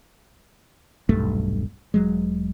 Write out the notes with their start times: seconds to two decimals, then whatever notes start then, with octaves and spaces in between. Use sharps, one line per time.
1.09 D#1 B1 G2 A3
1.94 E1 F#3 G#3